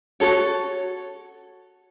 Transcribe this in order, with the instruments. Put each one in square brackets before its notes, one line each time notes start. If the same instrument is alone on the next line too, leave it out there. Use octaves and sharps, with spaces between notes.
[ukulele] F#4 A4 C#5